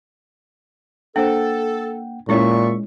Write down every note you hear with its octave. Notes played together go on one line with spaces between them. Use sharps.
A#3 D4 A4 C5 F#5 G5
A#2 G#3 C#4 E4 C#5 D5 E5 C#6